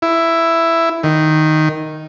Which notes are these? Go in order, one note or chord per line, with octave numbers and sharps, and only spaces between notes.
E4
D#3